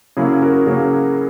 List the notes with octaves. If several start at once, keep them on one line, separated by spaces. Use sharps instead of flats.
C#3 F#3 A#3 C#4 E4 G#4
F#4 A#4
C#3 F#3 A#3 C#4